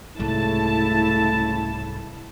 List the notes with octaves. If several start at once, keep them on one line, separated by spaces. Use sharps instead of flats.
C2 G#2 C#3 G3 A3 E4 A5